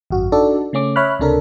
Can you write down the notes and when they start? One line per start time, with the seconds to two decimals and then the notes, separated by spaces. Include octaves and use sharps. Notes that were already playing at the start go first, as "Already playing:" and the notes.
0.10 G#1 F#2 F#4
0.32 D4 D#4 F#4 A4 D5
0.73 C#3 A3 C#4 D6
0.96 C#5 E5 B5 F6 F#6
1.19 C#2 C3 D4 A4 A#4